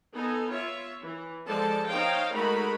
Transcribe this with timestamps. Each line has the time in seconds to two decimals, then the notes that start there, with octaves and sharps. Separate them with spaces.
0.14 B3 D#4 A4 G#5
0.50 F4 C#5 E5
1.01 E3
1.46 F3 G#3 A4 C5 D5 A5
1.87 D#4 C5 C#5 F5 G5
2.33 G#3 A3 D#4 F#4 A#4 B5